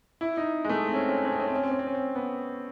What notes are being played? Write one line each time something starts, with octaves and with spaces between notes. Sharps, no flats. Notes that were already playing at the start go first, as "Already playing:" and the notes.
E4
D#4
G#3
A3
C4
C#4
C4
C#4
C4
C#4
C4
C#4
C4
C#4
C4
C#4
C4
C#4
C4
B3